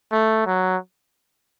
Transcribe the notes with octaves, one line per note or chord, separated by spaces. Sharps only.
A3
F#3